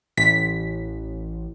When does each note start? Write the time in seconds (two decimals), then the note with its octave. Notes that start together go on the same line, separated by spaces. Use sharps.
0.18 A1 B6